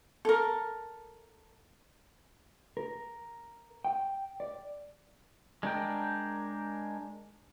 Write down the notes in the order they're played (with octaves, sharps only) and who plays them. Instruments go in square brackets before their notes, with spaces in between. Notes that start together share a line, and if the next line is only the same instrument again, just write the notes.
[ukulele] A4 A#4
[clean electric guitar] A#4
G5
D5
[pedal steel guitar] G#3 D4 A#4 G5